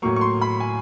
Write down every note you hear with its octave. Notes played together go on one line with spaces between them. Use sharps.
A2 F#3 A#3 C#6
C#6
C6
B5
G#5